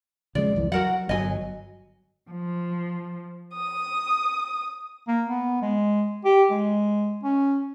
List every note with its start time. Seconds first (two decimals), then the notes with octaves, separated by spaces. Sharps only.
0.35 C#3 F3 G#3 D5
0.55 C2 F2 E3
0.72 F#3 F#4 A#4 F#5
1.09 G1 C3 F#3 D#5 G#5
2.30 F3
3.56 D#6
5.08 A#3
5.28 B3
5.62 G#3
6.25 G4
6.51 G#3
7.24 C#4